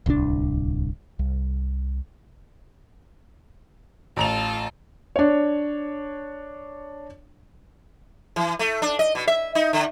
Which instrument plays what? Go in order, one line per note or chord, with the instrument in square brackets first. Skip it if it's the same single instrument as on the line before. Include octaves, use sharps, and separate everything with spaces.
[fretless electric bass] D1 C2 C4 D4
C2
[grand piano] A1 A#5 F7 [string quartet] F4 A4
[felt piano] D4 C#5
[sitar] E3
A3
D4
D#5
B2
E5
D#4
D3